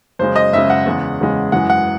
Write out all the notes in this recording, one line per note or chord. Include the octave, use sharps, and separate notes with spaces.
F#2 C#3 G#3 C5
D#5
F#2 C#3 G#3 E5
F#5
E2 C#3 G#3
E2 C#3 G#3
F#2 E3 G#3 F#5
F#5